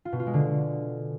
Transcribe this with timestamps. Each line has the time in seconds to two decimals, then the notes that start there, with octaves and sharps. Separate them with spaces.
0.05 F4
0.12 B2
0.19 F4
0.27 G#3
0.34 D3